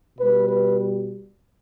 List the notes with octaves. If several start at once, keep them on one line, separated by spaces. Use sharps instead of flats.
B2 G3 B4
B4